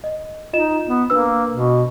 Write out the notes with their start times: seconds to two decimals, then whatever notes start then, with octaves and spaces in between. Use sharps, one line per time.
0.04 D#5
0.53 D#4 F4 D#5 E7
0.87 B3
1.10 A#3 D4 B4 E6
1.52 B2